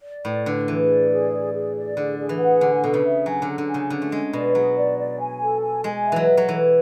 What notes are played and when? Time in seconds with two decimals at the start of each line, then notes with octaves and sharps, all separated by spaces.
0.04 D5
0.25 A2 B4
0.46 D3 B4
0.68 E3 G#4
0.90 D5
1.11 G#4
1.32 D5
1.53 G#4
1.75 D5
1.97 D3 G#4
2.19 G#4
2.29 E3
2.40 F#5
2.61 D3 G#5
2.83 B2 A4
2.94 C#3
3.05 E5
3.26 F#3 G#5
3.42 D3
3.47 A4
3.58 D3
3.69 G#5
3.74 C#3
3.90 D3 C#4
4.02 A3
4.12 G#3 C#4
4.33 B2 D5
4.54 F#3 G#4
4.76 D5
4.98 D5
5.19 G#5
5.41 A4
5.62 G#5
5.84 G#3 G#5
6.05 E5
6.12 E3 F#3
6.27 A4
6.37 F#3
6.48 E3 A4